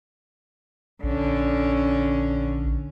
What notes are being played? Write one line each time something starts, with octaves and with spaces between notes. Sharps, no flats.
A#1 D3 C#4